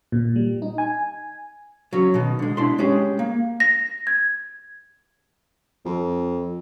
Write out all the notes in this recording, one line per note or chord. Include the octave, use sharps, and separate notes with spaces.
A#2
G3
D#4
G#5
F#3 C#4
B2 D#3
D3 G#3
B2 D4 E4 C6
G#3 C#4 G4 G#4
A#3
A#6
G#6
F2